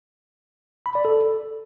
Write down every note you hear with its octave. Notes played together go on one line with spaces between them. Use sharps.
B5
D5
A4